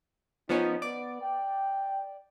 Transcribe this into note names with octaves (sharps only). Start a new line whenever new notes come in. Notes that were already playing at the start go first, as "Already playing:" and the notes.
F3 B3 C#4 D#4
B3 D5
G5